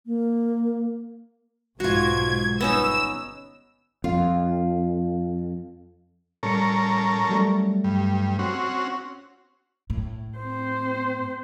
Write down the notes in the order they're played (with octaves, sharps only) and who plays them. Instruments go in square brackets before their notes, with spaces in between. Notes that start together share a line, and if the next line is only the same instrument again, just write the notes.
[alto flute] A#3
[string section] B1 G#2 G#6 [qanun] F4 F#4
[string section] G1 E6 [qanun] B3 C#4 D#4
[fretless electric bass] F2 [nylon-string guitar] F4
[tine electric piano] A2 G3 C#7 [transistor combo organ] C#4 A4 A#4
[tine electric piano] F#3 G3 A3
[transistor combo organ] G2
C4 C#4 F#4
[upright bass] A2
[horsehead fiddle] C4 C5